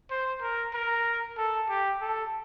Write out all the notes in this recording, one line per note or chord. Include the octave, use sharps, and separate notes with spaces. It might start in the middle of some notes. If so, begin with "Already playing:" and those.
C5
A#4
A#4
A4
G4
A4